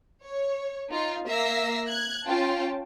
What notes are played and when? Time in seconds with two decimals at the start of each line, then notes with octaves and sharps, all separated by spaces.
0.26 C#5
0.90 D#4 F4
1.27 A#3 E5 F5 E6 A#6 C7
1.88 F#6 G#6
2.24 C#4 F4 G5 A5